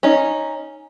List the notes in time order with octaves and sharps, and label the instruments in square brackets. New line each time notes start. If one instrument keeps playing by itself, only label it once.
[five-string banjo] C#4 D#4